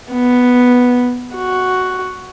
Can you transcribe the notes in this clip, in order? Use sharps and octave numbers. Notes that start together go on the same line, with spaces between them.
B3
F#4